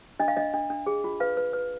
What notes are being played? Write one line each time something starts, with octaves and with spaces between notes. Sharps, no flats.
D4 D#5
F5
D4 D#5
D4
D4
G#4
F4
B4 F5
B4
B4